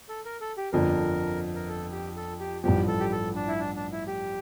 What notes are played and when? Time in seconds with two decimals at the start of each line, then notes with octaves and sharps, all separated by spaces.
0.09 A4
0.26 A#4
0.41 A4
0.57 G4
0.73 G1 F2 D3 F3 A#4
1.55 A#4
1.69 A4
1.92 G4
2.16 A4
2.40 G4
2.64 A1 G2 F3 G4
2.88 A4
3.00 G4
3.12 A4
3.35 D4
3.48 E4
3.59 D4
3.76 D4
3.92 E4
4.07 G4